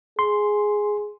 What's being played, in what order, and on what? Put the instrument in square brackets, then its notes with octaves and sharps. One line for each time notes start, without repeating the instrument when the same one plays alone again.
[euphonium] G#4 [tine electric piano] C6